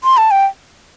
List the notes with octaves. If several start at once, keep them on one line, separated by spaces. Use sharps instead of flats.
C6
A5
G5